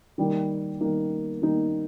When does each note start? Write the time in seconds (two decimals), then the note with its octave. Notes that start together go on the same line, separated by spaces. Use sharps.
0.18 D#3 G3 A#3 D#4
0.81 D#3 G3 A#3 D#4
1.42 D#3 G3 A#3 D#4